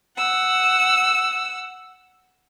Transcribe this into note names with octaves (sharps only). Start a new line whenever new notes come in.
F#5 E6